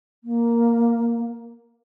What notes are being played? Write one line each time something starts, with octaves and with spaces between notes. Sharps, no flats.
A#3